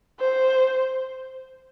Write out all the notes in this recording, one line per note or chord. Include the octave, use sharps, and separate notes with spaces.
C5